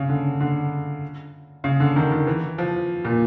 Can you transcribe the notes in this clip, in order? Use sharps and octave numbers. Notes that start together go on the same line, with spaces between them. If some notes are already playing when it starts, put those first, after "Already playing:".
Already playing: C#3
D3
D3
C#3
D3
D#3
D#3
E3
F3
A#2